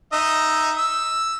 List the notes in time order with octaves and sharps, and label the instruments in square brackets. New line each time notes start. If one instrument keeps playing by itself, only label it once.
[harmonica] D#4 D#5 E5
E6